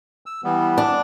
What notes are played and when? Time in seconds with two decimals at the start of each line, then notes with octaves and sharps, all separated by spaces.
0.26 E6
0.44 E3 G3 B3
0.78 D4